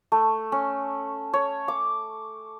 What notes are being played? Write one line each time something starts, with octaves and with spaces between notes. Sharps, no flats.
A3
C#4
C#5
D6